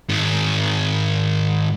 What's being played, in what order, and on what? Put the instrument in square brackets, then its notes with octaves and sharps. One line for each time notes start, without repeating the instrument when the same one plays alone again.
[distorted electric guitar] G#2 D#3